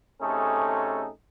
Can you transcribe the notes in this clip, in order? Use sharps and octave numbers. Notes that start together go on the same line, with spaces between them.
C3 A3 C#4 D#4 G#4 A4